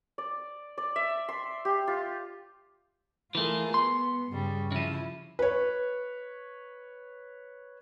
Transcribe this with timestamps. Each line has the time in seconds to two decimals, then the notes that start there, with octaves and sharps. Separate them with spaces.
0.18 D5
0.78 D5
0.96 E5
1.29 C6
1.65 G4
1.87 F4
3.35 E3 A3 F4 G#4 A#4
3.74 B3 C6
4.33 G2 C#3 G3
4.72 C#3 F3 E4
5.39 B4 C#5